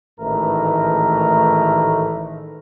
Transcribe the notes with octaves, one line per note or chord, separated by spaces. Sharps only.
A1 G#2 D#3 A3 A#4 B4